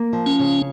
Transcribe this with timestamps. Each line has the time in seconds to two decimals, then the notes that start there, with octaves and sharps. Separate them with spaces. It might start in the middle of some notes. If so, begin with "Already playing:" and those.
Already playing: A#3
0.13 F3
0.26 C#4
0.39 C#3